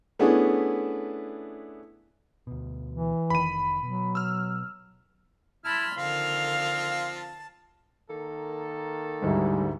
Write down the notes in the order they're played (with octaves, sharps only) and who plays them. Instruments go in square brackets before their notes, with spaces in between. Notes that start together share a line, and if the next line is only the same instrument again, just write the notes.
[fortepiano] A3 B3 C#4 D4 E4 G#4
[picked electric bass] D2 B2
[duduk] E3
[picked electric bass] F1 D#3 [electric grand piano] B5 D#7
[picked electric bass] B2 [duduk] F#3
[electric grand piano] E6 F6
[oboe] E4 [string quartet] A5 B5 C6 [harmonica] F6
[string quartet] D3 D#3 F6 [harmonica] F3 C4 [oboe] F5
[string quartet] A5
[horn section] D#3 A#3 A4
[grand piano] D2 G#2 E4 [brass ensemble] G3 G#3